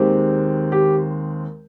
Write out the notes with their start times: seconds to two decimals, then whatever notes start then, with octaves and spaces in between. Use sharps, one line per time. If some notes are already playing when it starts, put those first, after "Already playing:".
Already playing: D#2 D#3 G#3 C4 G4
0.72 G4